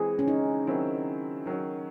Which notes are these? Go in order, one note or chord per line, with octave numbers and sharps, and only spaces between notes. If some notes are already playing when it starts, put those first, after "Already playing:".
Already playing: E3 G#3 C4 G#4
C#4
D#4
D#3 F#3 C4 E4
D#3 F#3 C#4